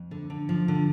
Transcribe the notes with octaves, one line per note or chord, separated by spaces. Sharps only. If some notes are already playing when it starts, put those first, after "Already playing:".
Already playing: F2
D3
D3
F3
D3